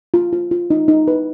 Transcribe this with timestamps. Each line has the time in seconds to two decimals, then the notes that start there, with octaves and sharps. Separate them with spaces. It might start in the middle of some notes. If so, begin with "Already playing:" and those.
0.14 F4
0.33 F4
0.51 F4
0.70 D#4
0.88 D#4
1.08 B4